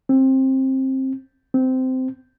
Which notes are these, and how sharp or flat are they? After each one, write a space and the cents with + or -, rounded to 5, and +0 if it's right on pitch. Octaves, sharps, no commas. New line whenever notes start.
C4 +20
C4 -15